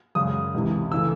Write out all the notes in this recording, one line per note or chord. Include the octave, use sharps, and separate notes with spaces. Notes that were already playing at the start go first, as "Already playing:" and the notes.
F#2 C#3 G#3 D#6
C#2 C3 E3
C#3 E3 A3 E6